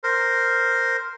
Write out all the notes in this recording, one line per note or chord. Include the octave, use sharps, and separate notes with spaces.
A#4 C5